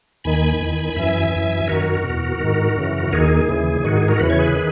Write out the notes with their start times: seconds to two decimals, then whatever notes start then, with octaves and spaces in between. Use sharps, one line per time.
0.24 D#2 D#3 G#5 B5
0.61 E2 D#3
0.96 F#2 E3 E5 G#5
1.32 F#2 E3
1.68 F#2 D#3 F#4 A#4
2.04 B2
2.09 E2
2.40 G#2 D#3
2.76 F#2 C#3 E3
3.12 D#2 D#3 G#4
3.48 D#2 C#3 E3
3.84 G#2 D#3 F#4
3.97 G#4
4.08 F#4 A#4
4.20 E2 C#3 E3 B4
4.30 C#5
4.39 G#4 B4
4.56 D#3